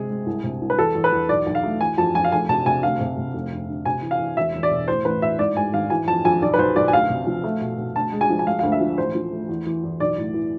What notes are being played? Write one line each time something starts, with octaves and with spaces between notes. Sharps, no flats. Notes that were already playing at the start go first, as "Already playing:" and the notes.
Already playing: C3 G#3 G#4
G#3
C2
C3
C2
B4
E2 A4
E2
B4
E2
B1 D5
B1
F5
A3
E3 G#5
F2 A5
F2 G#5
F5
F1 G#5
C3 A5
C3 G#5
D2 F5
C3
C3
F1
F1
D3
C3 G#5
E3
F5
E3
E1 E5
E1
D5
B2
A2 C5
A1 B4
A2 E5
G#2 D5
G#2 G#5
G#1 F5
E3 G#5
F2 A5
F2 G#5
B1 D5
B4
B1 C5
B1 D5
G#5
D2 F5
C3
F3
A3
B2
B2
D2 A5
G#3
G#5
F3
G#5
G#3 F5
F5
D2
E5
F3
A1 C5
F3
A3
E2
E3
E2
B1 D5
A2
E3